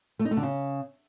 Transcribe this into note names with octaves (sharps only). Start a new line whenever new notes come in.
A3
D#4
A3
D3
C#3